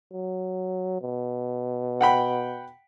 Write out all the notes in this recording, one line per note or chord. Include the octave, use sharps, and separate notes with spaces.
F#3
B2
F#5 G5 B5